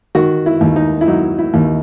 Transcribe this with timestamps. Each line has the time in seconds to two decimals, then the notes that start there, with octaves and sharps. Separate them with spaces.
0.15 D#3 F#4
0.46 E4
0.61 D#2
0.76 D#4
1.01 E4
1.07 F#3 D#4
1.39 E4
1.54 D#2